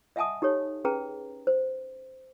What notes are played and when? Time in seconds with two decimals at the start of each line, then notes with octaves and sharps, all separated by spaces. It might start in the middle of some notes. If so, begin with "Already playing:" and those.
0.16 D#5 E5 F#5 G#5 A5 D#6
0.42 D#4 G4 A4 C#5
0.85 C#4 G#4 B4 G5 A#5
1.47 C5